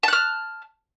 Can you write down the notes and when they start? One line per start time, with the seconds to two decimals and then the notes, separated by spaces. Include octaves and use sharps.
0.03 A5
0.08 F#6
0.13 F6